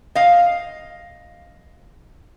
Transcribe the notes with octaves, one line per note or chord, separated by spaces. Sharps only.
D#5 F5